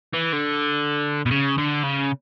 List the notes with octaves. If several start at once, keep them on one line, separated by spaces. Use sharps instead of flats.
E3
D3
B2
C#3
D3
C#3